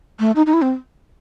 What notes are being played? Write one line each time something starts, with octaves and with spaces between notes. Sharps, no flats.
A3
D#4
D#4
E4
C4